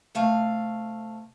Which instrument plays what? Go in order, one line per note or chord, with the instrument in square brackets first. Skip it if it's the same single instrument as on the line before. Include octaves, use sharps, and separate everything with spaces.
[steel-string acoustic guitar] C3 A3 F5